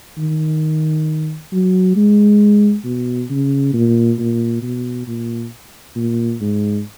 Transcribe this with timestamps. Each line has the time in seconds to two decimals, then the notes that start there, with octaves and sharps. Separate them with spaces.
0.18 D#3
1.52 F#3
1.96 G#3
2.85 B2
3.30 C#3
3.74 A#2
4.19 A#2
4.62 B2
5.07 A#2
5.96 A#2
6.41 G#2